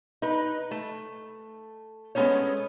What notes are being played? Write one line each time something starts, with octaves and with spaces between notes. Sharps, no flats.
D#4 B4
A3
G#3 A3 B3 C#4 D#4 C#5